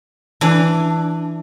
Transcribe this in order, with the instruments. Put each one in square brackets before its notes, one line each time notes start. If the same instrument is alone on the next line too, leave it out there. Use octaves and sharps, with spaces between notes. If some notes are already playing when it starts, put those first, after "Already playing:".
[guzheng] E3 D4